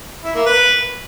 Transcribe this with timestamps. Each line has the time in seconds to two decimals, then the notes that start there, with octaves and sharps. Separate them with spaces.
0.24 E4
0.35 A#3
0.46 B4